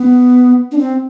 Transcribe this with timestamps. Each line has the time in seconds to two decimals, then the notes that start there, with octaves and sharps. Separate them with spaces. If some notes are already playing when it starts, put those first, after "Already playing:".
Already playing: B3
0.71 D4
0.78 C4